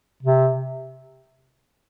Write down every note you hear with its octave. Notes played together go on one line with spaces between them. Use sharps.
C3